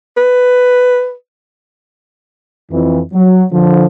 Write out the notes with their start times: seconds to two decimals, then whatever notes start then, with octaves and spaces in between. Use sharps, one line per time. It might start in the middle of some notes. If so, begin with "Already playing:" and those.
0.17 B4
2.71 F2 E3
3.14 F#3
3.52 D3 F3